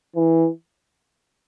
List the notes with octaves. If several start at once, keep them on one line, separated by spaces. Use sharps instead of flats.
E3